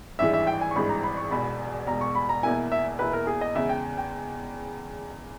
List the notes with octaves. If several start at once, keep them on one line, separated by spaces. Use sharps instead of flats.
G#1 G2 E3 G#3 E5
E5
G5
G#5
C#6
G#1 G2 E3 G#3 B5
A#5
B5
C#6
E1 E2 B2 B5
E1 E2 B2 A#5
C#6
B5
A#5
E2 B2 A#3 E4 G#5
E5
E2 B2 A#3 E4 B4
A#4
G#4
D#5
E2 C#3 G#3 E5
G5
G5